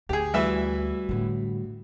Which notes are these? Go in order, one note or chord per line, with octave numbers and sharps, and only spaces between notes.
D2 G4 G#4
E3 G3 A3 F#4 E5 E6
A2 D3